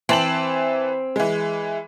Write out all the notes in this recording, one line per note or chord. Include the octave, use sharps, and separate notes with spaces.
E3 C4 A5 F#7
E3 G#3